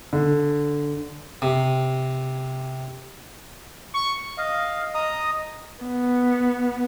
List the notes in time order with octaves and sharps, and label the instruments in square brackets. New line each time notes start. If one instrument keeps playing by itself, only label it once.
[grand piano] D3
[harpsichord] C3
[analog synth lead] C#6
[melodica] D#5 F5
D#5 A#5 D#6
[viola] B3